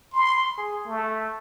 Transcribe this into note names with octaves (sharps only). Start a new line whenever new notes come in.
C6
G#4
A3